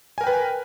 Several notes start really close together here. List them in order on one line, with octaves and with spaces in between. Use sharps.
G#5 A#4 G5 B4